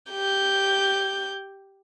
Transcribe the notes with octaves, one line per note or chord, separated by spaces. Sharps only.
G4 G6